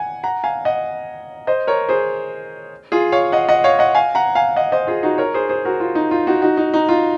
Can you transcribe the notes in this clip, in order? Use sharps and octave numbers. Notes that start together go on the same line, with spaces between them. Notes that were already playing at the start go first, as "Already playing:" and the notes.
Already playing: F#5 G#5
F#5 A#5
F5 G#5
D#5 F#5
C5 D#5
A#4 C#5
G#4 C5
F4 G#4
C#5 F5
D#5 F#5
D#5 F#5
C#5 F5
D#5 F#5
F5 G#5
F#5 A#5
F5 G#5
D#5 F#5
C5 D#5
F4 G#4
D#4 F#4
A#4 C#5
G#4 C5
G#4 C5
F#4 A#4
F4
D#4
F4
D#4 F#4
D#4 F#4
D#4
D#4
F4